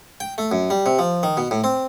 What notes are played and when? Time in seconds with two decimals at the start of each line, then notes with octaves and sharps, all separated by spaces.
0.20 G5
0.38 A3
0.52 F#2
0.70 G3
0.86 C3
0.99 F3
1.23 D#3
1.37 B2
1.51 A2
1.64 C4